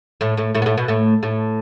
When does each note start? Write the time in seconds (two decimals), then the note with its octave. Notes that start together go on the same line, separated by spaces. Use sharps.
0.21 A2 A3
0.37 A2 A3
0.55 A2 A3
0.62 B3
0.66 A2 A3
0.77 B2 B3
0.88 A2 A3
1.23 A2 A3